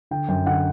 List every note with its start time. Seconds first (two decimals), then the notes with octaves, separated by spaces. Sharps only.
0.11 D3 G5
0.28 F#2 G5
0.46 D3 F#5